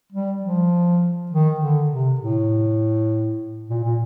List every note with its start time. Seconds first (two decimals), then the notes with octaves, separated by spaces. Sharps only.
0.12 G3
0.43 F3
1.31 D#3
1.60 D3
1.91 C3
2.20 A2
3.70 A#2
3.84 A#2